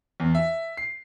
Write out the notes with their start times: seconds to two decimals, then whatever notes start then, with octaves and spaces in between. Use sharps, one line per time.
0.20 E2
0.35 E5
0.77 C7